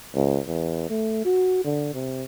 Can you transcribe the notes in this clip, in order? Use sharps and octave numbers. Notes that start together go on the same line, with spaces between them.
C#2
E2
A3
F#4
D3
C3